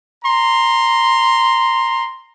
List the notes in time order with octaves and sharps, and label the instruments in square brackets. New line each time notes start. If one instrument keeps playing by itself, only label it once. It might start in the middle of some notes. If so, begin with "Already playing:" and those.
[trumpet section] A#5 C6